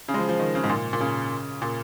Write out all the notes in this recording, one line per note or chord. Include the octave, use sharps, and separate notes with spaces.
C#3
G#3
F3
F3
D#3
C#3
G#2
A#2
A#2
C#3
A#2